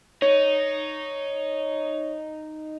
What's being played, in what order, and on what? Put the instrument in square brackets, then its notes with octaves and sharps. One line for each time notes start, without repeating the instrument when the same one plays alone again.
[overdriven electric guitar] D#4 [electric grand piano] C#5